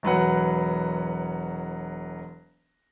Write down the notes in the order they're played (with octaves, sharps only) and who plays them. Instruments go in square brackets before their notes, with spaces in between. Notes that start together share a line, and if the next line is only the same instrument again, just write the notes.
[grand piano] E1 F#3 B4 F#5